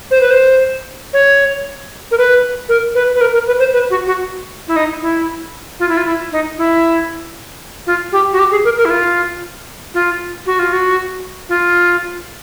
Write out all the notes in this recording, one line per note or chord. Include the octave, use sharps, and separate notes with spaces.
C5
B4
C5
C#5
A#4
B4
A#4
B4
B4
A#4
A#4
B4
C5
B4
F#4
F#4
E4
D#4
E4
F4
E4
F4
E4
D#4
E4
F4
G4
F#4
G4
G#4
A#4
A#4
E4
F4
F4
F#4
F4
F#4
F4